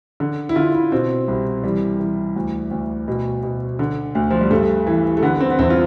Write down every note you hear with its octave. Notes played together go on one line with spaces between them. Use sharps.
D3
E4
D3 F4
E4
B2 C4
C2
E3 G3
E3
D2
D2
B2
B2
D3
D2
F3
G3
G2 A3
E3
A3
D3 B3
C4
B3
E2 C4
F4